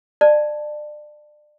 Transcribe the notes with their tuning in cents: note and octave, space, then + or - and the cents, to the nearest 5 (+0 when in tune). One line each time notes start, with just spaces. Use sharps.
D5 +30 A5 +0